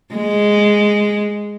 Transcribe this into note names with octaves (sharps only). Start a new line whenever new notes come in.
G#3